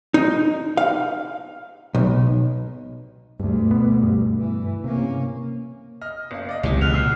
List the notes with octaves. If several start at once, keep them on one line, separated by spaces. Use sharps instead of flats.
D#4
F5
B1
D2 G2 B2
B3
G2
E3
C3 A#3 C#4
D#5 F6
F#1 F5
D5 D#5
F#1 C#2 C3 E3
G#3 B3 F6 F#6 F7
A#2 E6 C7